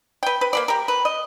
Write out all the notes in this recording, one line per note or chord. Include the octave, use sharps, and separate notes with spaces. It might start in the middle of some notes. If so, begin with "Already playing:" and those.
B4 G5
B4
A#3 B4 D5
G4 A#4
B4
D#5